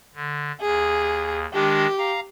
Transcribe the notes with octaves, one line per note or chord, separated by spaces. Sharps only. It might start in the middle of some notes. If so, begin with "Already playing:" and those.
D3
D#2 G#4
D#3 G#3 D4 G4
F5 A#5